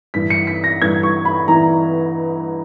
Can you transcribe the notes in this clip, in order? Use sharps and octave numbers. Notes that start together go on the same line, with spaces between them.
G2 E3 B6
C#7
B6
A#6
G2 E3 G#6
C#6
B5
E3 A#5